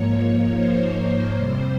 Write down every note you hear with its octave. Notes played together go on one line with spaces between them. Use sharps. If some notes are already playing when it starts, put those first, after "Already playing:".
Already playing: G#2 F3 A#3 C#5
C5
C#5
F2 C3 G3 C5